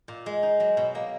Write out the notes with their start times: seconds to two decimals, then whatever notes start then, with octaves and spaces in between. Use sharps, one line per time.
0.08 A#2
0.26 G#3
0.43 D#4
0.60 F#3
0.77 B2
0.95 A#3